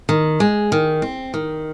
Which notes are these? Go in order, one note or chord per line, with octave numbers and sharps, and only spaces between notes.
D#3
G#3
D#3
C4
D#3